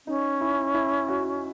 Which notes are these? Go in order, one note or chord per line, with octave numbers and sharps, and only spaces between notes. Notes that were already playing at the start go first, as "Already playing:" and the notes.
C#4 D#4
E4
E4
F#4